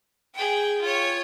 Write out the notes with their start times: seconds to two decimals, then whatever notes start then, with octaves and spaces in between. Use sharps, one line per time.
0.34 G#4 G5
0.81 F4 C#5